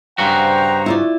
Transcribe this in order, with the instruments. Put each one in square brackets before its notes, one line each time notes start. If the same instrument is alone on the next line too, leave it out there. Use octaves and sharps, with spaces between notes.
[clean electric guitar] G2 C#3 F#4 [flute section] C5 A#5 [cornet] G5
[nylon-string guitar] E4 F4 D5